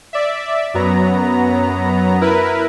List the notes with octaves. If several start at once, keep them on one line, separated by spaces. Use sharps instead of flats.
D5 E5
F#2 F#3 B3 A#5
E4 A#4 B4